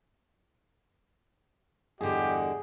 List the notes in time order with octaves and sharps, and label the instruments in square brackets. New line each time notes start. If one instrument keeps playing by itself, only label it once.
[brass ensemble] E2 D#5 F#5 [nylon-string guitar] G2 D3 [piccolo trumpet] G4 [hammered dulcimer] G#4